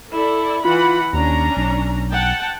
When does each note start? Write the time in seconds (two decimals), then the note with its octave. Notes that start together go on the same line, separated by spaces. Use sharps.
0.13 E4 A4 D5
0.65 E3 F4 F#5 B5
1.13 D#2 C#4 D4 A#5
1.57 B1
2.12 F#5 G5 A5